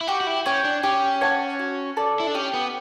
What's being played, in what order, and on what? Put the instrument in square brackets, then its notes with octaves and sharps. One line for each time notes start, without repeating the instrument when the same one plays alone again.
[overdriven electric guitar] E4
[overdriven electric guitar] F#4 [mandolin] G4
[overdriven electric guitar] F#4
E4
[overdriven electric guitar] C#4 [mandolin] C#5 G5
[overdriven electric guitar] D4
[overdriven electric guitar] C#4 [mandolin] G4
[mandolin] C#5 F#5 A5
F#4
A4 D5
[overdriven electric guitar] E4
D4
[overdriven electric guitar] C#4 [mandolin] G4
[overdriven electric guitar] B3